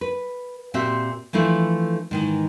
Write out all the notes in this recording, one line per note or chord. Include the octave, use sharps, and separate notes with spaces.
B4
A#2 C4 F#4 G4 E5
E3 F3 A3 D4 E4
G#2 D#3 E3